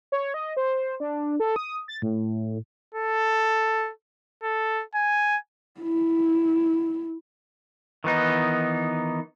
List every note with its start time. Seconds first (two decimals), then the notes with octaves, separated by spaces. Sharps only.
0.12 C#5
0.34 D#5
0.57 C5
1.00 D4
1.40 A4
1.56 D#6
1.88 A6
2.02 A2
2.95 A4
4.44 A4
4.95 G#5
5.80 E4
8.04 D#3 E3 B3 D#4